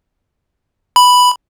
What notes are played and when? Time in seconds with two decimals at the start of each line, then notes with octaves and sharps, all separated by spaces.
0.96 B5